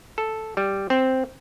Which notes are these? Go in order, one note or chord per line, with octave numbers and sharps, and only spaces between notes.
A4
G3
C4